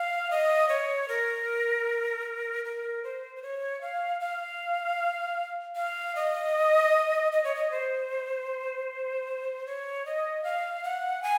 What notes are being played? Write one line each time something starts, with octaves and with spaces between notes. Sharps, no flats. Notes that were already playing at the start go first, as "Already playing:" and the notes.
Already playing: F5
D#5
C#5
A#4
A#4
C5
C5
C#5
F5
F5
F5
D#5
D#5
C#5
D#5
C5
C#5
D#5
F5
F#5
G#5